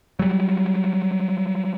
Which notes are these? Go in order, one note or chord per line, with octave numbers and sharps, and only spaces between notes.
F#3 G3